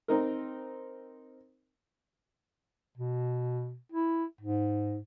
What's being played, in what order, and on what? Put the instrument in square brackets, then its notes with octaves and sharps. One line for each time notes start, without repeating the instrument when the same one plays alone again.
[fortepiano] C4 D#4 A#4
[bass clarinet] B2
E4
G#2